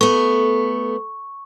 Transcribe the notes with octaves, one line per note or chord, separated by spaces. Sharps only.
A3 B3 A4 C#6